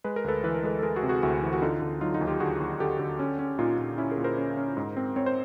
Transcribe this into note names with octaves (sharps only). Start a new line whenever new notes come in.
G#3 B4
A#4
D2 A4 B4
E3 B4
A#4
G#3 A4 B4
A4
G#3 G#4 A#4
F#4 G#4
C3
F#4 G#4
D2 E4 F#4
E3
F#4
D3 D#4 F4
D3
F#3 D#4 F4
D#4 F4
D#2
F4 G4
D3 F#4 G#4
D#2
D3 G4 A4
D3
C#4
C#4
A#2 D#4 F4
A#2
C#4 E4
G#4 A#4
A#2
A#4 C5
C#4
C#4
G#2
C4
C4 C#5
C5